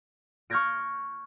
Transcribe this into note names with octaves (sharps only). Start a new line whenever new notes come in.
C#6 F6 G6 G#6 A#6 D7